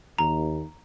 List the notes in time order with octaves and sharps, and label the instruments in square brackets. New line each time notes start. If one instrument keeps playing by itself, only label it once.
[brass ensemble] D#2 [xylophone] A#5